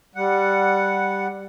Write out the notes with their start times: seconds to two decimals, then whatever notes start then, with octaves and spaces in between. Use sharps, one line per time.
0.15 G3 F#5